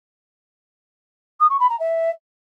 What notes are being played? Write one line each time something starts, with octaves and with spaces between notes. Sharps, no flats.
D#6
C#6
B5
A#5
E5